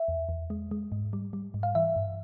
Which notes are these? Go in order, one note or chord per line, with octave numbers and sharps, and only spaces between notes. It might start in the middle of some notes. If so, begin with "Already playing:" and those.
Already playing: E5
E2
E2
G#3
G#3
G#2
G3
G3
G#2
F5
E3 E5
G2